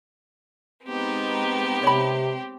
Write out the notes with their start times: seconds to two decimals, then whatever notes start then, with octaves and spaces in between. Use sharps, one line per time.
0.86 G#3 B3 C4 D#4 G4
1.83 C3 C#5 B5